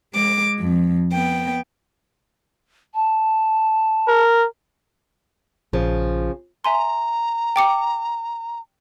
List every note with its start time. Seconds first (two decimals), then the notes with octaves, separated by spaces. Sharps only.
0.14 G#3 D6
0.58 F2
1.12 B3 G5
2.94 A5
4.08 A#4
5.73 A#1 C#3 F3
6.64 E5 G#5 A#5 C6
7.56 G5 D6 C#7